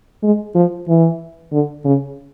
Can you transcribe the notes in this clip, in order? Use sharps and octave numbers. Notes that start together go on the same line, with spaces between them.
G#3
F3
E3
D3
C#3